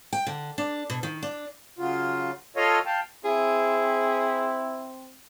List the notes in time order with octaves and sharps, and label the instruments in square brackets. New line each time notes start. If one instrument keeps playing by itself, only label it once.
[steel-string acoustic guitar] G5
D3
D4
B2
D#3
D4
[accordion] C#3 F#3 F4
F4 A4 C#5 D#5 F5
F5 G5 A5
[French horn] C4 [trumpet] E4 [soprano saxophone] G#4